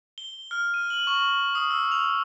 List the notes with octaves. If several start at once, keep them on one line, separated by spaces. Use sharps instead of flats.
G7
F6
D#7
F#7
C#6
D#6
E6
F7